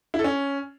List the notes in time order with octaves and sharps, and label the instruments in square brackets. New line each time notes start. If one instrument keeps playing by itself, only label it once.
[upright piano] E4
A4
C#4